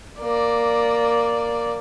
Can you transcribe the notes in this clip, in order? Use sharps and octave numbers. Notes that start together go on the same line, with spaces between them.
A#3 D5